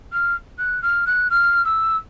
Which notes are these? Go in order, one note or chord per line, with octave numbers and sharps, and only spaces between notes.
F6
F#6
F6
F#6
F6
E6